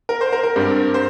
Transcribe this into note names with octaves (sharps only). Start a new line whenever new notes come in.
A#4
C5
A#4
A#4
G2 G3 C4
C5